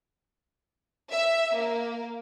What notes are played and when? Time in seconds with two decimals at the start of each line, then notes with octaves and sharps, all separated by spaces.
1.12 E5
1.55 A#3